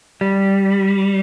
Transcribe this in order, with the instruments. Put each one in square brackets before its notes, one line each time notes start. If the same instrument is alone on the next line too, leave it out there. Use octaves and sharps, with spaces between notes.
[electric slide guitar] G3